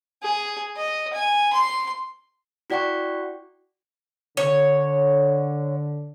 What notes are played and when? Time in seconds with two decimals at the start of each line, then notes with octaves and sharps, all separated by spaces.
0.23 G#4
0.77 D#5
1.13 G#5
1.53 C6
2.70 E4 F#4 D5 F#5 G5 C#6
4.37 D3 C#5